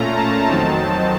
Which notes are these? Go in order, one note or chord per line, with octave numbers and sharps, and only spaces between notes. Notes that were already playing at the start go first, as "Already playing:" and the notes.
Already playing: A#2 A3 C#4 F4 A#5
A5
F2 D#3 F#3 C4 D#4 A5